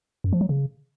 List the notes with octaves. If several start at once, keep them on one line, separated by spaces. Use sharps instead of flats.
F#2
F3
F#3
C#3